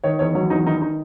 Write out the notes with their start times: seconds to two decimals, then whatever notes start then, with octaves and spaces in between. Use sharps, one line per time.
0.04 D#3 C#5
0.19 E2 C#5
0.35 F#3 C#5
0.50 E2 D#4
0.66 D#3 D#4
0.82 D#4